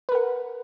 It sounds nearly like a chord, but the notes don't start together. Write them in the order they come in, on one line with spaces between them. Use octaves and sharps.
B4 A#4 F#5